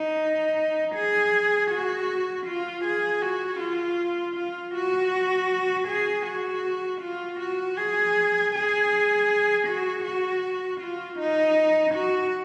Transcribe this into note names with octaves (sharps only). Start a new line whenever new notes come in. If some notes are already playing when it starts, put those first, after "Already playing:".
Already playing: D#4
G#4
F#4
F4
G#4
F#4
F4
F4
F#4
G#4
F#4
F4
F#4
G#4
G#4
F#4
F#4
F4
D#4
F#4